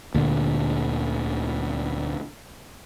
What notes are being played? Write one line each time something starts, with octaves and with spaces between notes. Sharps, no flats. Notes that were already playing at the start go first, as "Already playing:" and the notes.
D2 A#2 D3